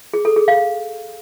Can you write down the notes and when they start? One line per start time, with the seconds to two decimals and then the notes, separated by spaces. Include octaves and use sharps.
0.13 G#4
0.25 A4
0.36 G#4
0.48 F5